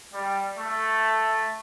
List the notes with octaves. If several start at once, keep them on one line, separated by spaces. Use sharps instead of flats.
G3
A3